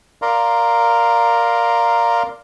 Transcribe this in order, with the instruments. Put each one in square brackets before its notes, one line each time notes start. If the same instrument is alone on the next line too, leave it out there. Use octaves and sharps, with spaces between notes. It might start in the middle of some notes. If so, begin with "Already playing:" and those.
[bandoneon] A#4 D5 F5 A#5 C6